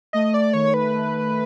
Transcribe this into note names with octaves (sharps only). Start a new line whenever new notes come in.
A3 D#5
D5
D#3 C#5
B4
A3